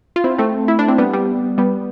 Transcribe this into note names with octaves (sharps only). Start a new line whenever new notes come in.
F4
C4 E4
A3 C4
E4
D4
C4
G3 B3
G3
G3 B3